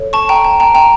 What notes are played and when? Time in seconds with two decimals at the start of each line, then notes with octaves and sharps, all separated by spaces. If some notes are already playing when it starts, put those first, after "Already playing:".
Already playing: A4 C#5
0.13 A5 C#6
0.29 G5 A#5
0.45 A5
0.60 G5 A#5
0.75 G5 A#5